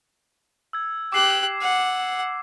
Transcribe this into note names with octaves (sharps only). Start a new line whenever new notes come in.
E6 G#6
G4 D6 F#6 C7
F#5